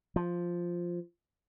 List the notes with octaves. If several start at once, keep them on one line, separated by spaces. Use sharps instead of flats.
F3